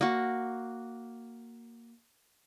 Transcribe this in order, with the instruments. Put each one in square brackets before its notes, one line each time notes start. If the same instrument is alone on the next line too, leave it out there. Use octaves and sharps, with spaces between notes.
[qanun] A#3 F#4